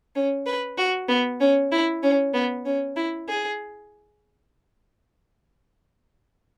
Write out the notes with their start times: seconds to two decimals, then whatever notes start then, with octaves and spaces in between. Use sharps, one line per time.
0.15 C#4
0.46 B4
0.78 F#4
1.08 B3
1.40 C#4
1.71 E4
2.03 C#4
2.33 B3
2.66 C#4
2.96 E4
3.28 G#4